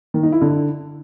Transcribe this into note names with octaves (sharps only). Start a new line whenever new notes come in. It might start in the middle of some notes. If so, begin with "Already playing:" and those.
D#3
D#4
E4
D3